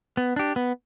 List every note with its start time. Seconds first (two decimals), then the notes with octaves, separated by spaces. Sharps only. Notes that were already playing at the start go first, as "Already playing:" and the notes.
0.17 B3
0.36 D4 G4
0.56 B3